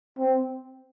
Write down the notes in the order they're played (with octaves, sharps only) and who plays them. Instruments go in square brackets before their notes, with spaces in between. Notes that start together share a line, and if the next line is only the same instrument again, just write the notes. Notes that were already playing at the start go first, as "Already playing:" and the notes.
[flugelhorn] C4